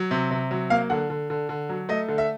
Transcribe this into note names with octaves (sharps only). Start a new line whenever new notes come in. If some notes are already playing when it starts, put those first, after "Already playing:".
Already playing: F#3
C3
C3
F#3
A#3 F5
D3 F#5
D3
D3
D3
F#3
A3 D#5
D3
E5